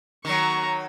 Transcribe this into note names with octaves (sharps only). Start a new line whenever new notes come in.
D#3 F#3 A#5 C#6